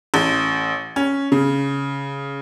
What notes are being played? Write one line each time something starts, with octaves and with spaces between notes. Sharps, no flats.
A1
C#4
C#3